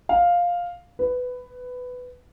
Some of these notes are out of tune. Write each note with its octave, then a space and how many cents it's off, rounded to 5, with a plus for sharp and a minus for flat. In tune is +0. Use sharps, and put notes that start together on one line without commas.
F5 +5
B4 +15